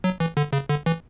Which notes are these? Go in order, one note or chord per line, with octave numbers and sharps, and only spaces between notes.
F#3
E3
D3
C#3
D3
E3